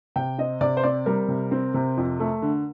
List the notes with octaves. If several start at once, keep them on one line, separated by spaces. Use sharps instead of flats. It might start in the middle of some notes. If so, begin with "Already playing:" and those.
C3 G5
C4 D#5
C3 D5
C5
C4 D5
G3 A#4
C3
C4
C3
F2
A3
D3